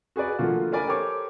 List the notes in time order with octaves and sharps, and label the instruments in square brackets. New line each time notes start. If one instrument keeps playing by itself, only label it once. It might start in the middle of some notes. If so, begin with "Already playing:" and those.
[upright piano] F#4 G#4 B4 D5
D3 F3 A3 A#3 F4 F#4
D4 A#4 D5 G#5 B5
G4 A4 A#4 C5 C#5 D6